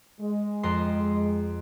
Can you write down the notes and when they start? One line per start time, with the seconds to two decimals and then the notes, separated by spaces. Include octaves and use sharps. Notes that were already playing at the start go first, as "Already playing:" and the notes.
0.21 G#3
0.63 F2 A#5 C6